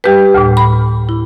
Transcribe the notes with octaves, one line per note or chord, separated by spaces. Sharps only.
G3 G4 B4
D2 A2
B5
E4